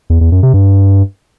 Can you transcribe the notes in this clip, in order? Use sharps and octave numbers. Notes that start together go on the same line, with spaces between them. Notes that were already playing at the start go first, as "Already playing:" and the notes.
E2
E2
F#2
C3
G2